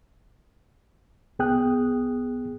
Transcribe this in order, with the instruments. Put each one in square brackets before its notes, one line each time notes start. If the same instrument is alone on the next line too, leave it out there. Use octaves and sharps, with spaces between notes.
[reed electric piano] C2 B3 G#4 G5 D#6 F#6